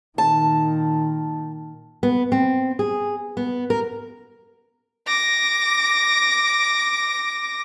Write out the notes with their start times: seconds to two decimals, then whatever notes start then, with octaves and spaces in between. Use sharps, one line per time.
0.18 A#2 D#3 A5
2.03 B3
2.32 C4
2.79 G#4
3.37 B3
3.70 A#4
5.07 D6 A#6